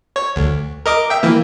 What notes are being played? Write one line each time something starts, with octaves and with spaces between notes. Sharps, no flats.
C#5
D2
A#4 D#5 D6
E5 G5
E3 A#3